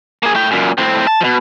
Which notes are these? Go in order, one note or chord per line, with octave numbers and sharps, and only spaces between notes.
A#3 G#4
A3 G5
F#2 A#2
A2 C4
A5
B2 F3